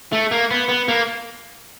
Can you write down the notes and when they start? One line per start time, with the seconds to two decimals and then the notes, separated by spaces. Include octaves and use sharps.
0.12 A3
0.31 A#3
0.51 B3
0.68 B3
0.88 A#3